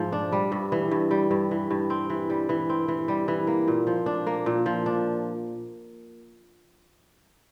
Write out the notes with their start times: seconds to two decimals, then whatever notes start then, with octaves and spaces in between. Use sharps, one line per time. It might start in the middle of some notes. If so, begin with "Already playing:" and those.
Already playing: G#2 F3 A3
0.12 D4
0.32 G3
0.52 G2
0.72 E3
0.91 G2
1.11 G3
1.31 G2
1.51 E3
1.71 G2
1.90 C4
2.10 E3
2.30 G3
2.49 E3
2.69 C4
2.88 E3
3.08 G3
3.28 E3
3.47 A#3
3.68 A#2
3.87 F3
4.06 D4
4.27 A#3
4.46 A#2
4.66 F3
4.86 D4